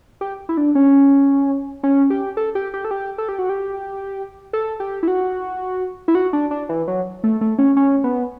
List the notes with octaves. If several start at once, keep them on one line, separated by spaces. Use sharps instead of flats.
G4
E4
D4
C#4
C#4
G4
A4
G4
G4
A4
G4
A4
G4
F#4
G4
A4
G4
E4
F#4
E4
F#4
D4
D4
E3
F#3
A3
A3
C#4
C#4
B3